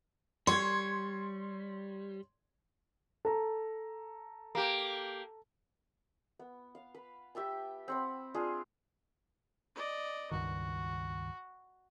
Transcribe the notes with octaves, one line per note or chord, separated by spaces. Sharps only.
G3 C#5 C6 G#6
A4 A#5
A#3 G4
B3
F5
B4
G4 E5 G5 A5
C4 F#5 B5
D4 F4 G#4
D5 D#5
C#2 G2 D#3 F#4